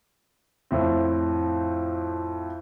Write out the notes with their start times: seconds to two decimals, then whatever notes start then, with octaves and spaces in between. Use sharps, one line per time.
0.71 F2 A2 C4